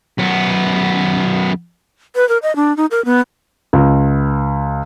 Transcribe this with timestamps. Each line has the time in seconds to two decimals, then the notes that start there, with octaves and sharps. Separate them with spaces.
0.19 F#2 B3
2.15 B4
2.29 A#4
2.43 D#5
2.56 D4
2.77 D#4
2.91 A#4
3.05 B3
3.73 C#2